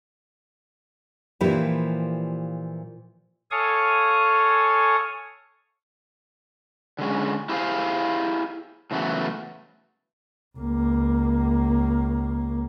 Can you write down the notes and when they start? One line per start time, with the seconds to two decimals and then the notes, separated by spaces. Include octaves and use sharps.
1.40 A#2 E3 F3 E4 G4 B4
3.51 A4 C#5 F5 G#5 C#6 D#6
6.99 D3 G#3 C#4
7.49 E4 G4 G#4 A#4 C5 F5
8.91 A2 C#3 E3 F#3 A3 B3
10.57 C#2 A#3